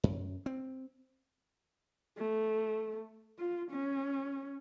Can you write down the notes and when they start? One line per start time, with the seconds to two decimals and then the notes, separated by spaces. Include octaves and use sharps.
0.04 F#2
0.46 C4
2.18 A3
3.38 F4
3.71 C#4